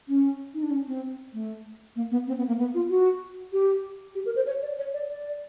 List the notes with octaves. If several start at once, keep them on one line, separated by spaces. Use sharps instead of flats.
C#4
D#4
D4
C#4
C4
A3
A#3
B3
C4
B3
A#3
B3
F4
F#4
G4
G4
A#4
C5
C#5
D5
C#5
D5
D5